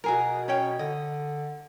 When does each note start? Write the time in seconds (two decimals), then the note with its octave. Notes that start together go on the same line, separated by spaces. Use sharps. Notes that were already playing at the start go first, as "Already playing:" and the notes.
0.04 B2 F#4 G#4 A#4
0.48 C#4 C#5 G5
0.79 D3 D#5